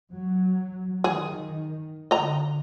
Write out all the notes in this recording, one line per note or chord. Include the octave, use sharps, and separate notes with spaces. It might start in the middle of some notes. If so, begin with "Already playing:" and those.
F#3
D#3 G#4
D3 D#5 A#5